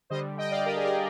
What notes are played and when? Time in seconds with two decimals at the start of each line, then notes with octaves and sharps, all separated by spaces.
0.10 D3 G3 C5 D#5
0.38 D#5 G5
0.51 D5 F5
0.66 G4 A#4
0.77 G#4
0.84 G4 A#4